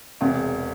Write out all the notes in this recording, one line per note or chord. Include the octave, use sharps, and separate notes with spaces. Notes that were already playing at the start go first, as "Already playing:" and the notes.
E1 E2 C3